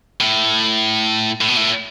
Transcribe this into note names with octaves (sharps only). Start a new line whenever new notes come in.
A2
A2
B2
A2